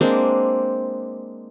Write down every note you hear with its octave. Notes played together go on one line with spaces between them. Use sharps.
G#3 A#3 C4 D4